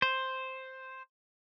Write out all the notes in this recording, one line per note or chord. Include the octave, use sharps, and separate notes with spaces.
C5